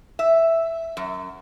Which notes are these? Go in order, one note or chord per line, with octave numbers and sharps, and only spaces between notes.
E5
F#2